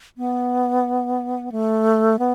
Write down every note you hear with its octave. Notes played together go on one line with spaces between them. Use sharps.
B3
A3
B3